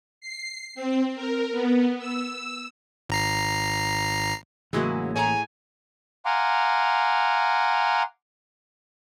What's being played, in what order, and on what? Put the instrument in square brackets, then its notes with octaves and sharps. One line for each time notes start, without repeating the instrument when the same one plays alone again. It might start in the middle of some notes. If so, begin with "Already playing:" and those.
[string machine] C7
C4
A#4
B3
E6
[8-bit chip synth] G#1 A#5 C7
[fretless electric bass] A1 A#3 [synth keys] C#3 F#3 [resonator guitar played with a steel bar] E3 G#3 E4
[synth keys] A2 A3 G#4 [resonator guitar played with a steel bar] C#5 A#5 [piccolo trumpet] G#5
[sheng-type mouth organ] F5 F#5 G#5 A#5 C6 D6